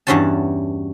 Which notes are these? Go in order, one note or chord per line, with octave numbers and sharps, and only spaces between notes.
E2 G2 G3 C#4 F#4 A5